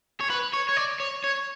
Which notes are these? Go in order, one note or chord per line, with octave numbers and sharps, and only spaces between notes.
C#5
B4
C#5
C#5
D5
C#5
C#5